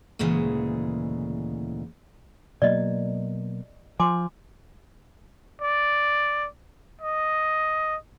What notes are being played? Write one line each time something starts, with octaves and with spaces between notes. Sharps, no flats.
D2 A#2 C#3 E3 G#3
B2 F#3 A#3 D5 D#5
F3 G#5 C6 D6
D5
D#5